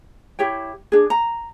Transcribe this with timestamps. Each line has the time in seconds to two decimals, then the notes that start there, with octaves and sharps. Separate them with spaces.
0.39 E4 G4 C#5 G5
0.92 D4 G#4
1.10 A#5